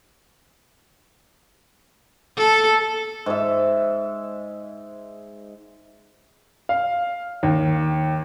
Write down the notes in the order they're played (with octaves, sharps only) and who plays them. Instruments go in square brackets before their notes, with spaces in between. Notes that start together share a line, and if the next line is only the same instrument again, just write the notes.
[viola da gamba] A4
[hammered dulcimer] G#2 E5
[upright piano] F5
D#2